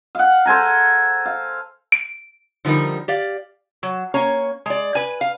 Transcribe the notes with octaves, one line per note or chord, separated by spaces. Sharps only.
F5 F#5
A4 C5 G#5 A#5
F5
D7
D3 F3 G3 D#4 A#4
G4 D5 F5
F#3
A#3 C#4 C#5
G#3 D5
B4 G#5
F5